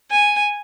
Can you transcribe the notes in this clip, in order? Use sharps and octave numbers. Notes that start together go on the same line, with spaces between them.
G#5